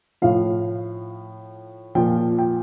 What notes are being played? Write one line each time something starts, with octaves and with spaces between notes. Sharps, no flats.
A2 F3 F5
A#2 F3 G5
G5